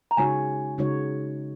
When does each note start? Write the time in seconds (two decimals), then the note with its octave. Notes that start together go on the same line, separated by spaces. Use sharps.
0.11 A#5
0.17 C#3 G#3 D#4 F#4 C#5 G#5
0.78 C#3 G#3 D#4 F#4 C#5